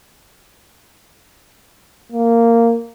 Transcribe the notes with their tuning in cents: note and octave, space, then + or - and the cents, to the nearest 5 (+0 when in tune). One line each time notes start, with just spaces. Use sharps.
A#3 -10